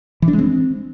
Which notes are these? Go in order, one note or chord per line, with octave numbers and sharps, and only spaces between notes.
E3
D4
G#3
C4